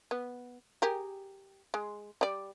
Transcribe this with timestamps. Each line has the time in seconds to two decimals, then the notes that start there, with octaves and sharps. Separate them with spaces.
0.11 B3
0.82 G4 G#4 A#4
1.74 G#3
2.21 G3 D5